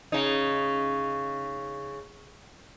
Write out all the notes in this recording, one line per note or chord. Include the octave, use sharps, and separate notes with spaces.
C#3 D#4